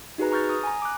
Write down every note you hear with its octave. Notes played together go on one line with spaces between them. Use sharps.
D#4 F#4 G#4 B4 A#5
A#5 C#6 F6 G6 A6
D#6
G#5 A#5
D6 F#6